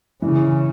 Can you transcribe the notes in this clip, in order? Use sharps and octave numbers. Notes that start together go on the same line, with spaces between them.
C#3 E3